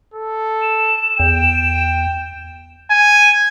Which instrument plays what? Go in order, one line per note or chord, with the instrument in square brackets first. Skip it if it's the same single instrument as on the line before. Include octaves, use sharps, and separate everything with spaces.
[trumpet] A4
[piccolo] E7
[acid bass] E2 [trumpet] G5
[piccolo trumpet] G#5